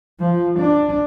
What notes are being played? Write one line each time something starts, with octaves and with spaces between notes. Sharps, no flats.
F3
D4